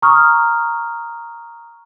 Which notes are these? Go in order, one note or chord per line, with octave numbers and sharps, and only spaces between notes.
A#5 C#6 D#6 F6